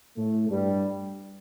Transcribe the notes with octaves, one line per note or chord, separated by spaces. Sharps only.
A2 A3
G2 G3